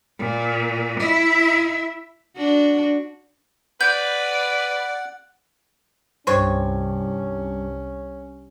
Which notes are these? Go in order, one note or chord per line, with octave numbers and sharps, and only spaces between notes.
A#2
E4 E5
D4 F#4
B4 D5 F#5 G6
C2 G2 C#4 D4 C5 C#5